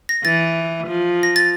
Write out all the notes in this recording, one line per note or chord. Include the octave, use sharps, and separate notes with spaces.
A#6
E3 A6
F3
A#6
A6